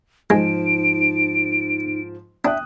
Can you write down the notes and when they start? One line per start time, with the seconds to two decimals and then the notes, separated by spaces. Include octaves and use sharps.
0.30 G#2 F3 G#3 D#4 D7
2.45 D4 E5 G5 D#6 F#6